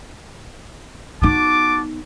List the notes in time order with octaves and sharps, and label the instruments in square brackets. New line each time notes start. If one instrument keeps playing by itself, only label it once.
[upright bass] B3 D#4 [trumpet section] F#4 A5 D6